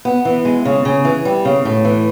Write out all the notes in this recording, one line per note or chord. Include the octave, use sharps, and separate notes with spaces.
B3
E3
G#3
C#3
C#3
E3
G3
C#3
A2
E3